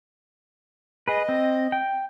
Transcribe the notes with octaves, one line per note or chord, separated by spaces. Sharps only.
G#4 B4 D#5
C4
G5